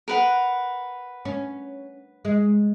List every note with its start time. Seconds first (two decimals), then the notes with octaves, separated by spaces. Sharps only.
0.08 A#4 B4 F#5
1.25 C#4
2.25 G#3